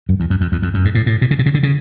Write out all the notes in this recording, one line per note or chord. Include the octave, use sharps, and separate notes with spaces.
F#2
E2
F#2
F2
E2
F2
F#2
G#2
A2
A2
B2
C#3
C3
C#3
D3
C#3